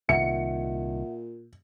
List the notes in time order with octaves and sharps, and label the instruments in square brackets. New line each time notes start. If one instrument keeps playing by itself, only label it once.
[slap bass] C2 D#3 [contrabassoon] A#2 [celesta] E5 F#5 [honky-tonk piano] C#7